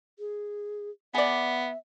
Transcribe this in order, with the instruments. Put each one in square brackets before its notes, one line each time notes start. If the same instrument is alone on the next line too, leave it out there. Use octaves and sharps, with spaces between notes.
[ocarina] G#4
[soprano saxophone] B3 [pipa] G#4 D5 [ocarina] E5